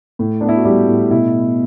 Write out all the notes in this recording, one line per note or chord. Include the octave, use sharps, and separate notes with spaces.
A2
B3 D4
E4
F#4
G3 E4 G4
A2
B2 E4